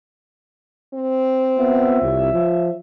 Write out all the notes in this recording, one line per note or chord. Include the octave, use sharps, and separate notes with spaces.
C4
B3 F4 C#5 E5
C2
F3